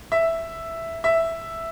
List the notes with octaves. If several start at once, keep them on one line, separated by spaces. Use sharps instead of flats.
E5
E5